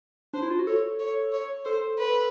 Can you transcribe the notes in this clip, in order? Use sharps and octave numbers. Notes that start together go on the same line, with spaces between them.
D4 C5
E4
F4
F#4
A4 C#5
C#5
C#5
A4 C5
B4